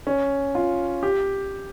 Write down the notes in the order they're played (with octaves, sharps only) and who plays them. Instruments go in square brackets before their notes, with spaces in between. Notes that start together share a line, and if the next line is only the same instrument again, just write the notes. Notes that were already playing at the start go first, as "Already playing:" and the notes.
[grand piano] C#4
F4
G4